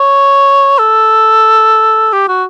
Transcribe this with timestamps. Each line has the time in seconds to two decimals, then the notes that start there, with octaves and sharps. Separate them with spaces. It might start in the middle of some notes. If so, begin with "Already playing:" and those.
Already playing: C#5
0.78 A4
2.13 G4
2.28 F#4